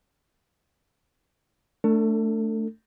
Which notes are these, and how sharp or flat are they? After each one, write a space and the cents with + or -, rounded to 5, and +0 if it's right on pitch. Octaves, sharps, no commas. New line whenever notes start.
A3 +0 D4 +0 A4 +35